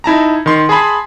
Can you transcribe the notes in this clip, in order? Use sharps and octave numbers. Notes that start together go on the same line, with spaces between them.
D#4 E4 A5 A#5
D#3 C6
G#4 A5 B5 C6